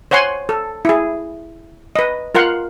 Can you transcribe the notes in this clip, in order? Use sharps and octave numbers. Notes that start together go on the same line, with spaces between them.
C5 C#5 F#5 G#5 C6
A4
E4 G#4
B4 D#5
F4 A#4 F5 F#5 C6